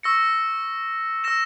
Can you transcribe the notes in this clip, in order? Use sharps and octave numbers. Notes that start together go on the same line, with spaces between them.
C#6 E6 A#6 C#7
E6 A#6 E7